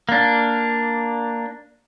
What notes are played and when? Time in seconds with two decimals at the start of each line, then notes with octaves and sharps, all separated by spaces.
0.09 A#3 D4